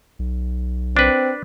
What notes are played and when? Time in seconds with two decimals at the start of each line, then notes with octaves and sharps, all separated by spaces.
0.19 B1
0.97 C4 D4 B4